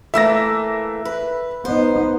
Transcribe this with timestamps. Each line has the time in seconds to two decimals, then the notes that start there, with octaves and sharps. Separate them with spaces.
0.14 E3 A3 A#3 E5 E6 A#6
1.05 B4
1.65 B3 D#4 C5